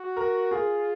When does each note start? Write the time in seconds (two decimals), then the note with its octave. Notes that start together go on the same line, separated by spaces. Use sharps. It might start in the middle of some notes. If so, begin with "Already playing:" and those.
Already playing: F#4
0.16 A#4
0.51 F4 G#4